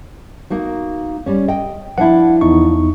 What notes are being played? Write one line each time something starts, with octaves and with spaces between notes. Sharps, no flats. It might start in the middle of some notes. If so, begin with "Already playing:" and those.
A#3 D#4 F#4
G3 C#4
D#5 G5
F3 D4 E4 F#5
E2 D#4 C#6